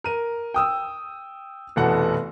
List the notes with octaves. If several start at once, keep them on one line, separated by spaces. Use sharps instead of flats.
A#4 D#7
G5 D#6 E6
F1 B2 E3 A4 F#5